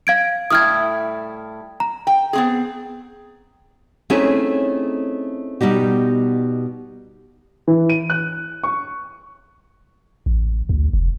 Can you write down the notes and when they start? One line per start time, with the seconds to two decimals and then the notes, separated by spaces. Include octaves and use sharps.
0.07 F5 G#6 D7
0.51 A2 G3 E4 D#6 F6 G#6
1.80 A#5
2.07 G5
2.33 B3 C4 G#4
4.10 A3 C4 C#4 D#4 E4 G#4
5.61 B2 G3 D#4 G4
7.68 E3
7.89 D#7
8.10 F#6
8.63 C#6
10.26 A1
10.69 D2
10.93 F1